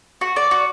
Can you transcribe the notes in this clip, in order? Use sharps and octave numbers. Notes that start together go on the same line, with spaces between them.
F#4
D5
F#4